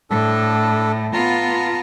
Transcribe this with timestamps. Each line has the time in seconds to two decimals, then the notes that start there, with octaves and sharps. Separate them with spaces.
0.10 A2 D4 A4
1.13 B3 F4 A5 A#5